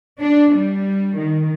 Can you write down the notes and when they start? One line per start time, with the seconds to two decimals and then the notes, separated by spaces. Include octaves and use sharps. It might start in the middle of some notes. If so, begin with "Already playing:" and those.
0.21 D4
0.55 G3
1.18 D#3